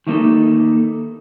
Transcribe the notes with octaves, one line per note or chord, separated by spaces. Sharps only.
D#3 A3 A#3 D#4 A4